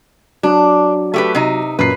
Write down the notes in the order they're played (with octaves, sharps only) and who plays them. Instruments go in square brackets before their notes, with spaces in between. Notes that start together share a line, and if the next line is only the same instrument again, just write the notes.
[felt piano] F#3 [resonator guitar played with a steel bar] D4
[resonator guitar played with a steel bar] A3 G4 B4
C3 D#4
[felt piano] F#2 A#2 C7 [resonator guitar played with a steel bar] B4